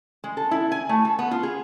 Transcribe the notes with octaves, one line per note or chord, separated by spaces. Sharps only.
G#3
A4
E4
G#5
A3
A4
B3
F4
G#4